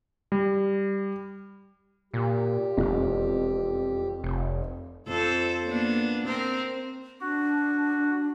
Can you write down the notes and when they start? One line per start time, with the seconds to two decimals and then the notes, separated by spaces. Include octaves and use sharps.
0.32 G3
2.14 A#2 G4
2.77 E1 F2
4.24 F1
5.08 F2 A4 C5
5.66 A#3 B3 D4
6.24 C4 A#4
7.21 D4 F#4